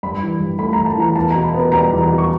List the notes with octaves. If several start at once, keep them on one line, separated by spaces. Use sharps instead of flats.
G2 B5
E3
G2
A3 B5
A#5
G2
A5
E3 A#5
E2 A5
B2 A#5
B5
B3
G3 A#5
E2
B2
C#6